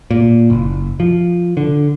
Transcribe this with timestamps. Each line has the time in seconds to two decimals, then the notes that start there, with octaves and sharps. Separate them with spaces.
0.11 A#2
0.50 F#1
1.00 F3
1.57 D3